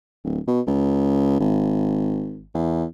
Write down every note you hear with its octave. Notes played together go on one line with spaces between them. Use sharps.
D1
B2
C#2
G#1
E2